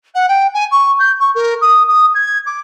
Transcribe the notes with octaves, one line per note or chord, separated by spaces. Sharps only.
F#5
G5
G#5
C#6
G6
C#6
A#4
D#6
D#6
G#6
D6